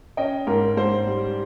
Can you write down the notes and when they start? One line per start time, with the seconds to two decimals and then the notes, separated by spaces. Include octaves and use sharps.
0.17 C#4 D#5 G5
0.47 G#2 A#4
0.77 G#2 C5
1.07 G3